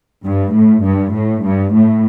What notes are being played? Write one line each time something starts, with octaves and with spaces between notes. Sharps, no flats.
G2
A2
G2
A2
G2
A2